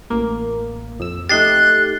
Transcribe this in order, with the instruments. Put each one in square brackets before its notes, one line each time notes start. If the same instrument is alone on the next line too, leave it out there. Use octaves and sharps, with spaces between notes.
[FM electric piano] A1 A#3
F2 E6
[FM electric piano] A3 D#4 G4 [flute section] F#6 [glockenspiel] A6 C7 G7